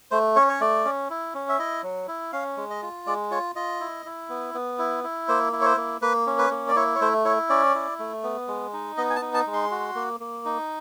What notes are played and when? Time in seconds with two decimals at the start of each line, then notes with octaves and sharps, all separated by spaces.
0.11 A3 C5
0.36 C#4 C#5
0.49 C#5
0.61 A3 D5
0.85 C#4
1.10 E4
1.34 C#4
1.49 E5
1.59 E4 D#5
1.83 F#3
2.08 E4
2.33 C#4 F5
2.57 G#3
2.70 D#5
2.83 F4
3.06 G#3 D5
3.31 F4 C#5
3.56 F4 D#5
3.81 E4
4.06 E4
4.29 B3
4.54 B3
4.79 E4
5.04 E4
5.28 A#3 C5
5.53 E4
5.61 C#5
5.65 C5
5.77 A#3
6.01 A#3 B4
6.27 C#4
6.38 B4
6.51 A#3
6.68 D5
6.76 E4 C#5
6.95 C#5
7.01 A3 C5
7.25 E4 C#5
7.50 C#4 D5
7.75 E4
7.99 A3
8.23 B3
8.48 G#3
8.73 D#4
8.97 B3 D#5
9.10 G#5
9.16 A5
9.22 D#4
9.34 A5
9.47 G#3
9.53 C6
9.71 F#4
9.95 A#3
10.20 A#3
10.45 D#4